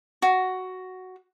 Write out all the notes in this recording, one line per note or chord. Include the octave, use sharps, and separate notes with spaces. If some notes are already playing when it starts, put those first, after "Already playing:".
F#4